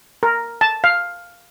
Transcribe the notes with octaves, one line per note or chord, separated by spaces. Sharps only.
A#4
A5
F5